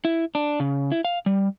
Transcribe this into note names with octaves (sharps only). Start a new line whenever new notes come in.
E4
D4
C#3
E4
F5
G3